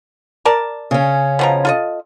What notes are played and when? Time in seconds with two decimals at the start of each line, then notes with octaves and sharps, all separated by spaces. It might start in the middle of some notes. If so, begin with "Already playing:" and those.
0.45 A#4 D5 A5
0.91 C#3 C#4
1.39 B2 F3 A#5
1.65 F4 A4 D#5